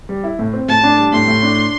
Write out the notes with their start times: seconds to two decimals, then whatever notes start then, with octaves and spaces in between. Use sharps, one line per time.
0.09 G3
0.24 E4
0.39 A2
0.53 C4
0.68 A2 A5
0.84 D4
0.98 G3
1.13 A2 C6
1.27 A2
1.43 D4